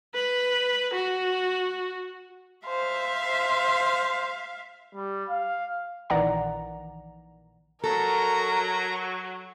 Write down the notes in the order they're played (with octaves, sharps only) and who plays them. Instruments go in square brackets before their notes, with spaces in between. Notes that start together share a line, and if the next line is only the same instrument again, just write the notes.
[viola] B4
F#4
[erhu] C5 [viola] E5 F5
[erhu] C5
[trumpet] G3
F5
[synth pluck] A#1 D#3 E3 D5 F#5 A#5
[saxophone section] F#3 [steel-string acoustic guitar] A4 [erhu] A#4 [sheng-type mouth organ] A#5